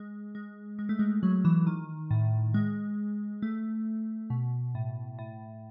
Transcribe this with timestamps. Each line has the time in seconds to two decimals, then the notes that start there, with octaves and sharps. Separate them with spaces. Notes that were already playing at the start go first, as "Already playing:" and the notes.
Already playing: G#3
0.35 G#3
0.79 G#3
0.89 A3
0.99 G#3
1.23 F#3
1.45 E3
1.67 D#3
2.11 A2
2.54 G#3
3.42 A3
4.30 B2
4.75 A2
5.19 A2